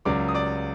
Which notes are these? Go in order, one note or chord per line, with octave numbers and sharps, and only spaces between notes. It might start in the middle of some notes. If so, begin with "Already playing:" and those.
C#2 C#3 F#3 D5 D6
D#6
D5 D6